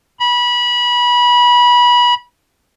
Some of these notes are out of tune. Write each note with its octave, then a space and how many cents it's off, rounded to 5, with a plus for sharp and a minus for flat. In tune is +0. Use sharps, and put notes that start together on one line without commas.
B5 -25